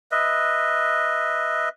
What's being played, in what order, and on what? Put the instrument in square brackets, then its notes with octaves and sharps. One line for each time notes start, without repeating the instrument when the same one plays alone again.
[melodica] B4 D#5 E5